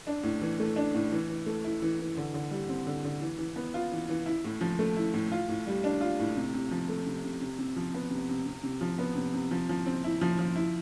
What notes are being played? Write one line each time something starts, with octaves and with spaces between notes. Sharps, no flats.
D4
A2
E3
A3
D4
A2
E3
E3
A3
E4
E3
E3
D3
D3
G3
C4
D3
D3
E3
E3
B3
F4
E3
E3
E4
A2
F3
A3
E4
A2
F4
A2
G3
D4
F4
A2
C3
C3
F3
A3
C3
C3
C3
C3
F3
B3
C3
C3
C3
C3
F3
B3
C3
C3
F3
F3
C4
E4
F3
F3
E4